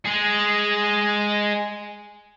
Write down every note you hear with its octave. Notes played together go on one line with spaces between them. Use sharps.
G#3 G#4